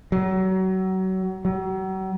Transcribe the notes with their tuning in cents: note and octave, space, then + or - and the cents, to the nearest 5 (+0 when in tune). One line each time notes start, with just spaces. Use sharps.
F#3 +30
F#3 +40